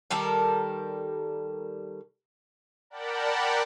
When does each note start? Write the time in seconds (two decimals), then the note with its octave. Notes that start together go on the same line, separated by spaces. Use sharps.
0.10 D#3 G3 A4 A#4
2.90 A#4 D5 F#5 G5 A5 B5